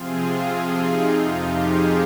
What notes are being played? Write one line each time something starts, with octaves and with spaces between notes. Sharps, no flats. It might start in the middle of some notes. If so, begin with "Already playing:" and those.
Already playing: C3 F3 C4 F4 G#4
F4 G#4
F4
D#4
F2 C3 F3 F4
D#4 G4
F4 G#4